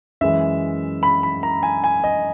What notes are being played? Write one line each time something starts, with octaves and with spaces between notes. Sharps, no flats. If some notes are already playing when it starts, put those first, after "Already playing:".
F#2 E3 G#3 E5
B5
B5
A#5
G#5
G#5
D#5